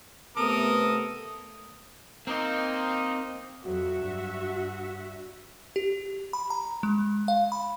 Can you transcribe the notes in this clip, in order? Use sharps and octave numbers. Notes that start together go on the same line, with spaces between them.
C3 A3 B3 A4 A#4 D#6
A#3 C4 D#4
F2 F#3 F#4 E5
G2
G4
B5
A#5
G#3
F5
B5